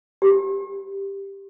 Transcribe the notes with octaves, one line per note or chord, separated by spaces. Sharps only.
G4